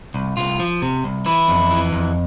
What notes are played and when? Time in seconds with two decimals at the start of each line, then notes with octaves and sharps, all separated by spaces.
0.14 C2
0.37 C2 F4
0.60 F3
0.82 C3
1.04 C2
1.26 E3 E4
1.48 F2
1.71 E3
1.92 F2